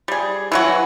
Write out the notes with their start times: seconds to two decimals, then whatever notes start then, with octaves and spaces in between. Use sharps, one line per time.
0.08 G3 G#4
0.52 E3 F#3 F#4